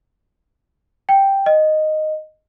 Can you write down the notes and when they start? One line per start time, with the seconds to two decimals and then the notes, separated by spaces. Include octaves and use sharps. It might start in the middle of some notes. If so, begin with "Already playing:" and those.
1.09 G5
1.46 D#5